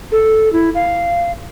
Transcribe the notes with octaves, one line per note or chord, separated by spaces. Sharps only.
A4
E4
F5